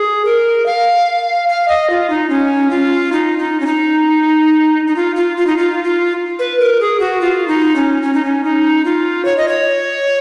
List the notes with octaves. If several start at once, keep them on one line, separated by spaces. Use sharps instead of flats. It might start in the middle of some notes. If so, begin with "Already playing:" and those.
Already playing: G#4
A#4
F5
F5
D#5
F4
D#4
C#4
F4
D#4
D#4
C#4
D#4
D#4
F4
F4
F4
D#4
F4
F4
B4
A#4
G#4
F#4
F4
D#4
C#4
C#4
D#4
C#4
D#4
F4
C#5
D#5
C#5